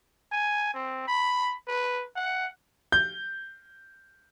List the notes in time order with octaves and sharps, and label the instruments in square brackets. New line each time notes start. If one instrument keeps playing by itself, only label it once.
[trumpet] G#5
C4
B5
B4
F#5
[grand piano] G6